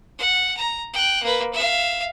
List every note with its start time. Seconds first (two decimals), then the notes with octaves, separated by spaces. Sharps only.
0.19 F#5
0.57 A#5
0.93 G5 F#6
1.23 A#3 B4
1.53 E5 F5